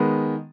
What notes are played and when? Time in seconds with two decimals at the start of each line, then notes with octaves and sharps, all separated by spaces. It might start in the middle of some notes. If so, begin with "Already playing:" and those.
Already playing: D#3 G#3 B3